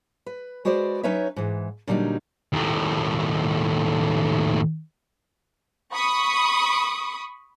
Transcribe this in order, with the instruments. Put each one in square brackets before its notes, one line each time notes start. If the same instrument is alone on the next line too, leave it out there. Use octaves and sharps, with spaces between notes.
[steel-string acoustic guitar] B4
G#3 F#4 B4 C5 D5
F#3 C#4 D#4 B4 C#5 E5
G#2 E3
A#2 D3 F#3 G3 C#4 D#4
[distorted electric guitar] D#2 A2
[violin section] B5 C#6 D#6